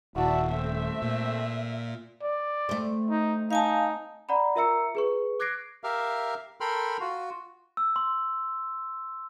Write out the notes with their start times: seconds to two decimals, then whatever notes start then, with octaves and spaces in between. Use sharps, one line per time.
0.16 D#1 E4 F#4 D5 E5 A5
0.50 A3 C4 E5
1.02 A#2
2.22 D5
2.69 A3 C4
3.10 D#4
3.51 D#4 F5 G#5 A5
4.29 D5 F#5 A#5 B5
4.56 F4 A#4 E5 A#5 E6 C#7
4.95 G#4 B4 C#6
5.40 D6 F#6 G#6 A#6 C7 D7
5.84 G4 A#4 E5 F5
6.61 A4 A#4 G5 B5 C6 F6
7.00 F4 F#4
7.77 E6
7.96 C6